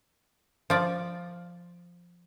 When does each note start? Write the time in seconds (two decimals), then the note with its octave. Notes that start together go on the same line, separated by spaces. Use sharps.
0.70 F3 D5